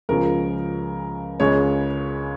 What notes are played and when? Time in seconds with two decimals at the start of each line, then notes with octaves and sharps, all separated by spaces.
0.09 C#2 C#3 F3 A#4
1.40 C#2 C#3 G#3 C#5